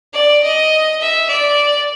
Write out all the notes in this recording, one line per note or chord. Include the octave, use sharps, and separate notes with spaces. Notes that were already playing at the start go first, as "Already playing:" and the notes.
D5
D#5
E5
D5